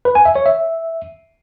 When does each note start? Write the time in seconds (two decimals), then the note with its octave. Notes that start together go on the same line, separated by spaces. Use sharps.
0.05 B4
0.15 G#5
0.25 E5
0.36 C#5
0.46 E5